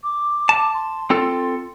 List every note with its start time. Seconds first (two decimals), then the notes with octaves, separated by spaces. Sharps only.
0.04 D6
0.49 A5
0.74 C6
1.10 C4 F4 A4